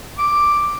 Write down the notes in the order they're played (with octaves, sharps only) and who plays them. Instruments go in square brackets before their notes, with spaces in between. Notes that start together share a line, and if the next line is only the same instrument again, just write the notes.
[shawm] D6